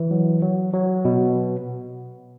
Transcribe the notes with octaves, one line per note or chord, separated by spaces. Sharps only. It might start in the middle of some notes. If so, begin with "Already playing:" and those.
Already playing: E3
F#3
F#3
F#3
B2